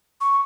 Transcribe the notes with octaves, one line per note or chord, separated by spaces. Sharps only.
C#6